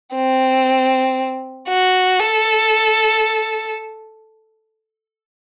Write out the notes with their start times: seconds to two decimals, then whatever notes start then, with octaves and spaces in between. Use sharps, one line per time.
0.15 C4
1.68 F#4
2.20 A4